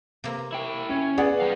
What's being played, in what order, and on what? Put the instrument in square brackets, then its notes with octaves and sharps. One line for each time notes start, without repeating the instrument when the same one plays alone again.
[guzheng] C3 A#3
[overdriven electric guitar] E4 G5
[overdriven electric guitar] C#4 [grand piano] E4
[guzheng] B3 [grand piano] G#4 D5 F#5
[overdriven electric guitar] G3 F5